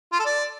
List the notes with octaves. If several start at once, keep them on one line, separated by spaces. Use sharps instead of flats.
F4
A4
D5